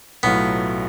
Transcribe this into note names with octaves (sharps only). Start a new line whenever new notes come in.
B1 A2 F#3 A3 B3 F4